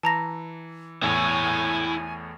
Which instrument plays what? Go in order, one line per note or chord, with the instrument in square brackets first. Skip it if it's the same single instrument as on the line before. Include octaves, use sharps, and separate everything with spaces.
[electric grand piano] E3 [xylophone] A5 A#5 A#6
[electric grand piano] E2 A2 [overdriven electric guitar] E4 C#5 [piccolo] G#5